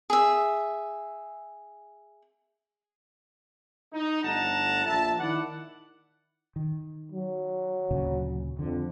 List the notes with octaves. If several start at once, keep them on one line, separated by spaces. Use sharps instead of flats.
G#4 E5
D#4
G1 A3 F#5 A5 A#5
A#1 E5 A5
D#3 E4 D5 F#5
D#3
F#3
D2 A#2 C#3
F2 D3